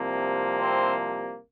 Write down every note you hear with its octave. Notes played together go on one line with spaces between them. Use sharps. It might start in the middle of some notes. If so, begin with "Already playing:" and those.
Already playing: C2 C3 F3 A#3
C4 C5